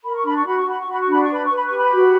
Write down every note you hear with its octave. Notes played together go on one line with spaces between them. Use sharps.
A#4 B5
C#6
D4 B5
C#6
F#4 B5
C#6
F#4 B5
C#6
F#4 B5
C#6
D4 B5
C#6
B4 B5
C#6
B4
B5
C#6
G4
B5
F#4